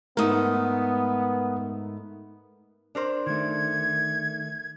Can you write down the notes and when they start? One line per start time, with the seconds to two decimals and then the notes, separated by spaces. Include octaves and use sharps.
0.17 G#2 A3 B3 A#4 D#6
2.95 D4 A#4 C5
3.27 D#3 A3 G#6